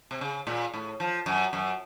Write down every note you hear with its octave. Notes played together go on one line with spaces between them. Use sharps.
C3
C#3
A#2
A2
F3
F#2
F#2